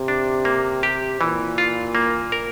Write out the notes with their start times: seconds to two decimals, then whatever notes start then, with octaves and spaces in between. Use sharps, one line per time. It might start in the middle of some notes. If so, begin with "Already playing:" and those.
Already playing: C3
0.08 D4
0.45 A#3
0.83 G4
1.21 A#2 E3
1.58 F4
1.95 A#3
2.32 A#4